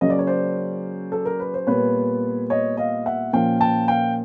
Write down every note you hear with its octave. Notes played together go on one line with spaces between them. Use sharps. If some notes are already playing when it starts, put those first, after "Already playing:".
C#3 F#3 A#3 C#4 D#5
D5
C#5
C5 D5
A4
A#4
B4
C5
A#2 G3 B3 B4 C#5
C#5 D#5
D#5 F5
E5 F#5
A#2 F3 A#3 C#4 F5 G5
G5 A5
F5 G5